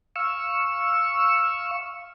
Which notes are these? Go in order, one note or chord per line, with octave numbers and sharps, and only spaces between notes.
F5 C#6 E6